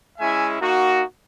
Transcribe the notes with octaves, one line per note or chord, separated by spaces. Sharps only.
G#3 C#4 E4 E5 G#5
A#3 D#4 F#4